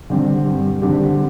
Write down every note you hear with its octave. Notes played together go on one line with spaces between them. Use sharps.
D3 G3 C4 G4
G2
D3 G3 C4 G4